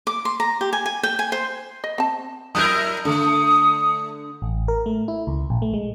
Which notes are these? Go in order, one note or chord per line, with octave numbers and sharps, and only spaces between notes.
D6
C6
A#5
G4
G#5
G#5
G5
G#5
C5
D#5
C4 A5
F#3 E4 A#4 D#6 F#6 G6
D3 A3 D#6
A1
A#4
A3
E4
C#2
A#1
A3
G#3